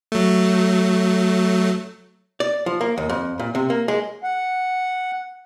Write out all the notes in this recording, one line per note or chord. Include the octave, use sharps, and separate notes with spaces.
F#3 A3
D5
F3
A#3
D#2
F2
A#2
C3
A#3
G#3
F#5